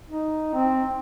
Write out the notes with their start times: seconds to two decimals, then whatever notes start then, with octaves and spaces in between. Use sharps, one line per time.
0.09 D#4
0.54 C4